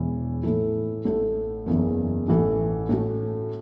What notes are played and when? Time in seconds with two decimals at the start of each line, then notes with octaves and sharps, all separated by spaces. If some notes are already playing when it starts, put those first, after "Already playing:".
Already playing: E1 E2 E3
0.43 A2 E3 A3 E4
1.05 A1 A2 A3
1.66 F#1 E2 C#3 E3
2.28 A1 A2 E3 A3 C#4
2.89 A2 A3 C#4 F#4